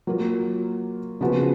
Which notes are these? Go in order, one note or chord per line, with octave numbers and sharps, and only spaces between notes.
F#3 A#3 F4
C#3 F3 B3 F#4